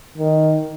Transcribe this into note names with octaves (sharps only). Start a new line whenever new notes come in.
D#3